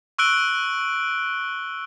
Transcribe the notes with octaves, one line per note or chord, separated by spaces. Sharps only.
C#6 E6 F#6 D7 G7